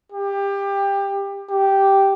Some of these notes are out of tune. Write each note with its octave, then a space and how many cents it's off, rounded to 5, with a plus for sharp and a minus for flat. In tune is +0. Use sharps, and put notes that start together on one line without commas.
G4 +20
G4 -5